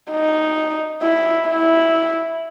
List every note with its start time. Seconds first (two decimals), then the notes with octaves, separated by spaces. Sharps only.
0.11 D#4
1.02 E4
1.48 E4